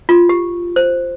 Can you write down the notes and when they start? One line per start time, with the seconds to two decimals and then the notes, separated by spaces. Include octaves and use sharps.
0.09 F4
0.29 G4
0.76 C5